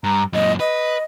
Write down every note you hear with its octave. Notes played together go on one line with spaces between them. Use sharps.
G2 A#5
F#2 A#2 D#5
B4 D#5